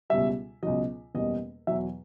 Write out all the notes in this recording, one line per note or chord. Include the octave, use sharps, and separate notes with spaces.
C#2 B2 G3 E5
C#2 B2 F#3 D#5
F#1 E2 B2 G3 D#5
E2 B2 F#3 E5